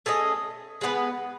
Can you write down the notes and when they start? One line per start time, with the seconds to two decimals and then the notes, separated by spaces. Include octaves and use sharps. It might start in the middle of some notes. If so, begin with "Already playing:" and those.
0.06 A3 C#4 G#4 D#5
0.81 G#3 B3 E4 B4